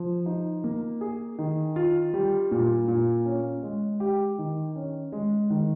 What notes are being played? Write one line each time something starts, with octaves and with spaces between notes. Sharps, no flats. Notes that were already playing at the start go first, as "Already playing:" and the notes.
Already playing: F3
D#4
A#3
G#4
D#3
F4
G3
A#2
A#2
C#4
G#3
G4
D#3
C#4
G#3
D#3